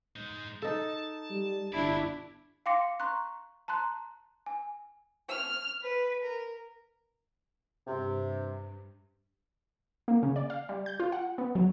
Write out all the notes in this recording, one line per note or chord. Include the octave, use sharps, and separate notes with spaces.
G#3 D#4
D#4 A4 A5
G3
G1 D4 E4 F#4 D5
F5 G5 C6 D6 A#6 C#7
A#5 C6 C#6 F#6
A5 A#5 C6 F#6
G#5
F6
B4
A#4
G2 C3
A#3
C#3
D5
F5
G3
G6
F4
F#5
B3
F#3